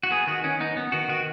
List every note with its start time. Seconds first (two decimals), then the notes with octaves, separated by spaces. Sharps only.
0.03 F#4
0.11 B3 G#4
0.27 D#3 F#4
0.44 D#3 C#4
0.60 B3 D#4
0.77 B3
0.92 D#3 F#4
1.09 D#3 F#4